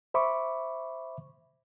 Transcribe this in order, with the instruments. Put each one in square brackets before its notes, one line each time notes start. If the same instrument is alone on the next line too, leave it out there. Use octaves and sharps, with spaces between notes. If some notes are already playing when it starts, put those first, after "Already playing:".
[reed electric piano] C5 E5 B5 C#6 D6